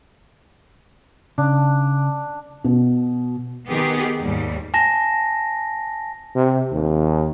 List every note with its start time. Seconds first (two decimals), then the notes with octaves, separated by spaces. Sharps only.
1.38 C#3 D4
2.64 B2
3.69 D#3 B3 G4 G#4
4.22 D#2 G#2 G3
4.74 G#5 A5 A#6
6.35 C3
6.71 D#2